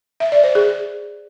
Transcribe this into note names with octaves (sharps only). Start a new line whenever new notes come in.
E5
D5
C5
G#4